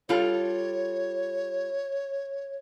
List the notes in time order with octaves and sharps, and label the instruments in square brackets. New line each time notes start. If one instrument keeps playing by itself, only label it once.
[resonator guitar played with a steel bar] G3 F4 A4 [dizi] C#5